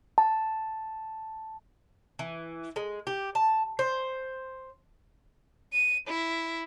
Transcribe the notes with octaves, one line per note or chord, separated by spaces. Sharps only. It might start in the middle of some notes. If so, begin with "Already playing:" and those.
A5
E3
G#3
G4
A5
C5
D#7
E4